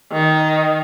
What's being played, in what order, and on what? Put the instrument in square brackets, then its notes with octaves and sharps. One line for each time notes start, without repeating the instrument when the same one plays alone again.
[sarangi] D#3